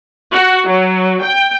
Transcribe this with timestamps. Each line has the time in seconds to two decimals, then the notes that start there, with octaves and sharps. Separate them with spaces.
0.32 F#4
0.70 F#3
1.24 G5